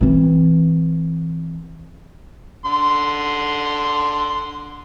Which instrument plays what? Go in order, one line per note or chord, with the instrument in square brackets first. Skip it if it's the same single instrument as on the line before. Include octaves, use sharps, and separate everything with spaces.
[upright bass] E3 C4
[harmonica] D3 C6